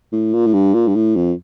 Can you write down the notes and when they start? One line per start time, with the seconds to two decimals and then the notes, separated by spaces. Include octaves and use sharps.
0.12 A2
0.33 A#2
0.46 A2
0.54 G2
0.74 A#2
0.88 G2
0.95 A2
1.16 F2